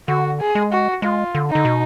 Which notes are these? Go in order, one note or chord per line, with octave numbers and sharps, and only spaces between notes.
D3 F#4
G#4
G#3
F#4
G#3 F4
D3
D#4
D3
B2